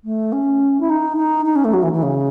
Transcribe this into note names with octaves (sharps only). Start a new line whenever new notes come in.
A3
C#4
E4
D#4
D#4
D#4
C#4
A3
F#3
E3
E3
C#3